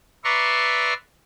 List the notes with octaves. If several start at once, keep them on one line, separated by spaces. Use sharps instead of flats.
B4 D5 E5 A#5 C6 C#6